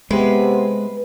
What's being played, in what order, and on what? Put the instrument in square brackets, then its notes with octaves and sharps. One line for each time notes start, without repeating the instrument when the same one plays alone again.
[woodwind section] C3 B3 [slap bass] G#3 [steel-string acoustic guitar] B4